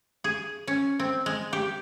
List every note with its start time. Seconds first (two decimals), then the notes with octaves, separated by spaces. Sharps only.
0.24 G#4
0.67 C#4
1.00 C4
1.26 G#3
1.53 G4